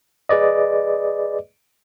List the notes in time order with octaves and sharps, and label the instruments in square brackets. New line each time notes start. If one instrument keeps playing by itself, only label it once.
[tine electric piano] G#4 B4 D5 D#5